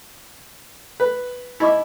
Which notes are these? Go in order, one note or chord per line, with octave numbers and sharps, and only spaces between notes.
B4
D#4 E4 D#5 D6